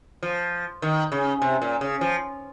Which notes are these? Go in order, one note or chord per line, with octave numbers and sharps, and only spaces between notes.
F3
D#3
C#3
C3
A#2
C#3
F3